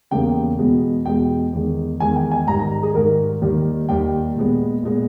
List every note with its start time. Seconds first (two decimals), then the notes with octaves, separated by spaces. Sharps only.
0.11 E2 C#3 G3 A#3 G5
0.59 E2 B2 G#3 B3
1.05 E2 B2 G#3 B3 G5
1.53 E2 D#3 G#3
2.00 E2 D#3 G#3 G#5
2.16 G5
2.31 G#5
2.47 G#2 D#3 G3 A#5
2.59 A#5
2.83 G#4
2.95 G#2 D#3 G3 A#4
3.42 D#2 D#3 G3
3.89 D#2 D#3 G3 G5
4.36 A#2 G#3 B3
4.83 A#2 G#3 B3